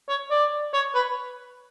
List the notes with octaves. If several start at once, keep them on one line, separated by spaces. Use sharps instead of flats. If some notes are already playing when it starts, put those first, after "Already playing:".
C#5
D5
C#5
B4